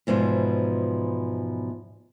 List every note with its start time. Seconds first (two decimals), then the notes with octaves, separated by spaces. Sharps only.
0.07 E2 G#2 B2 F3